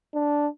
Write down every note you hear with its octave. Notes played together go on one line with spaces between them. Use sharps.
D4